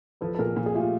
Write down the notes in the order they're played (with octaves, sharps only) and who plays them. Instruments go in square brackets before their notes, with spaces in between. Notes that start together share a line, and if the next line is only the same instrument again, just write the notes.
[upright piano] F3 [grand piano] A4 B4
[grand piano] A4
[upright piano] A#2 [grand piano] G#4 A#4
[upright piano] A#2
[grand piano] G#4
[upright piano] A3 [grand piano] F4 G4